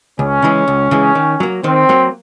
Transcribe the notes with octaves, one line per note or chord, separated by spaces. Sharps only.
C#2 C#4
C#3 E3 G#3
C#2
C#3 E3 G#3
D#3
F#3 A#3
D#3 C4
F#3 A#3